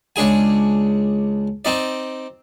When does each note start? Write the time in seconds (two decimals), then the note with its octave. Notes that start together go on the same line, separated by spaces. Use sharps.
0.16 C#2 D4 G#4 G#5
1.65 C4 D#4 D5